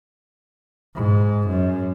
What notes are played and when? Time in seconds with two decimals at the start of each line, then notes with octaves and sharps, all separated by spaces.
0.95 G#2
1.49 F#2